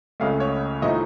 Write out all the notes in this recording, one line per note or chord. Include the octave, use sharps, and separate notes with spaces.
C#2 C#3 A3 F5
C#5
A2 F3 A3 D#4 D#5